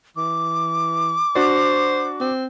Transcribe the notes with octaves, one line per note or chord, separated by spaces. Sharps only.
E3 D6
D4 F#4 C5 D5
C4